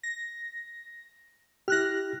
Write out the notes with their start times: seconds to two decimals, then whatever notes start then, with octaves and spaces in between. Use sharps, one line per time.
0.03 A#6
1.68 E4 G4 F6 F#6 A#6